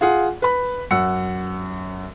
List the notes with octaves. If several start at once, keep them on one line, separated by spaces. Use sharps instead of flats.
F4 G#4 F#5
B4 B5
F#2 F#5 E6 C#7